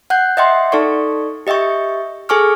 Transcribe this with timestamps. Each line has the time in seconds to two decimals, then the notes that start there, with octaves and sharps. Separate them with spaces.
0.10 F#5 F#6 G6
0.37 D#5 E5 F#5 G5 C6
0.72 D#4 A4 D5 C#6
1.47 G4 D#5 E5 G5 C#6
2.29 G#4 A4 G#5 C#6 D6 F6